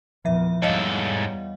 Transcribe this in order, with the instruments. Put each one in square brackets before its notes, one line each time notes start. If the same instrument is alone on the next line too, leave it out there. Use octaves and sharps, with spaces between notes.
[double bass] E2 A#2 [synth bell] F3 E5
[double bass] E2 G3 [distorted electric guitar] G#2 A4 [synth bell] C#5 D#5 F5